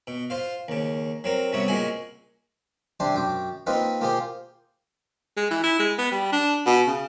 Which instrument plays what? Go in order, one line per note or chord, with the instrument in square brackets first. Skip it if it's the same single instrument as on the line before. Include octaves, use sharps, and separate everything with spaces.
[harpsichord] B2
F4 C5 F5
D#2 C#3
F#3 C4 A#4
G2 C3 B3 F#4 C#5 E5
C#2 A#2 G#3 F#4 G#5
C3 G3 D4 C5 C6
F#2 G5 D6
A#3 C4 D#4 F4 A#4 B4
A#3 F4 G4 G#4 C5
[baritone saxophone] G#3
E3
E4
G#3
B3
G3
D4
B2
C#3